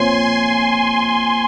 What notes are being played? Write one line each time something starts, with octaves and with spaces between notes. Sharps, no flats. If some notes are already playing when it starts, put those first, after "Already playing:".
Already playing: A#2 F3 C4 C#5 G#5 C6